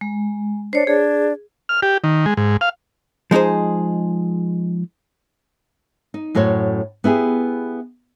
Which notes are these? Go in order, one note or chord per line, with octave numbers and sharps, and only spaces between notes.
G#3
D4 C5 C#5
D4 G#4
F6
G4
D#3
G#3
G#2
F5
F3 G#3 D#4 G#4 C5
D#4
F#2 A2 F#4 C5 C#5
B3 E4 G4 G#4